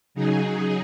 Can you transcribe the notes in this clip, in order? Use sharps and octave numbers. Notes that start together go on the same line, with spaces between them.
C#3 F#3 D#4 G#4